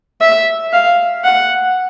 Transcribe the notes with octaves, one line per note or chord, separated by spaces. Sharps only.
E5
F5
F#5